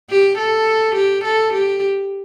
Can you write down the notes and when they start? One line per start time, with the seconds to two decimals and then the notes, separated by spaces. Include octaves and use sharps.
0.10 G4
0.38 A4
0.96 G4
1.25 A4
1.54 G4